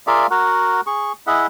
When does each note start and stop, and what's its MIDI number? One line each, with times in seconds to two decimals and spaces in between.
0.07 0.27 65
0.07 0.27 68
0.07 0.27 70
0.07 0.27 74
0.07 0.27 76
0.07 0.27 77
0.31 0.81 66
0.31 0.81 70
0.31 0.81 78
0.87 1.12 68
0.87 1.12 85
1.27 1.47 64
1.27 1.47 68
1.27 1.47 75
1.27 1.47 76
1.27 1.47 78